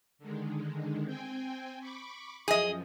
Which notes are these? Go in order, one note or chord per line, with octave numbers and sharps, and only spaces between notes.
D3 D#3 G#3
C4 G5 G#5
B5 C#6 D6
F#2 F3 G#4 D#5